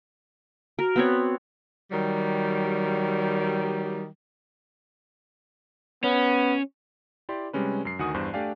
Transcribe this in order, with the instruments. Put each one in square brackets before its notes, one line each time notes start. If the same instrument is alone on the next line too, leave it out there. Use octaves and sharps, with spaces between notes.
[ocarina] F#4 [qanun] A#4
[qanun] B3 C4 C#5
[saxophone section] D#3 F#3 G3
[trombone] B3 [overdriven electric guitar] C#4
[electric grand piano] E4 G4 D5 C6
C3 G3 G#3 C#4 B4
F#2 C7
D2 D#3 F#4 F#5 G#5 D#6
E2 G2 C5 F#6
A3 D4 G4 D5 F5 G#5